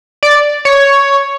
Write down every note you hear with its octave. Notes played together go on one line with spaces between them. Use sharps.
D5
C#5